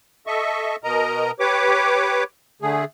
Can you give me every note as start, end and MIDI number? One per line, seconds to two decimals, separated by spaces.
0.27 0.76 69
0.27 0.76 75
0.27 0.76 76
0.27 0.76 85
0.84 1.31 47
0.84 1.31 70
0.84 1.31 75
0.84 1.31 82
1.40 2.24 67
1.40 2.24 71
1.40 2.24 73
1.40 2.24 86
2.62 2.85 50
2.62 2.85 57
2.62 2.85 68